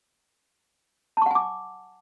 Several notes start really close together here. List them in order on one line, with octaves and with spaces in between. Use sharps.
A5 C#6 F#5 G#5 D6